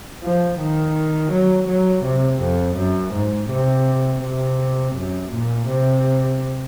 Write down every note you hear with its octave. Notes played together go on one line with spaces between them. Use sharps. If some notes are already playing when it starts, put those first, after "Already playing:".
F3
D#3
F#3
F#3
C3
F2
F#2
G#2
C3
C3
F#2
A#2
C3